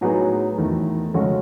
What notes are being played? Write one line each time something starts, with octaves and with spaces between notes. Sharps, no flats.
A2 F#3 B3 D#4 G#4
E2 D#3 A3
C#3 G#3 C#4 F#4 A4